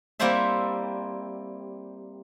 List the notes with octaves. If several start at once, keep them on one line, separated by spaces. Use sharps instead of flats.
G3 A#3 C4 E4 C5 E5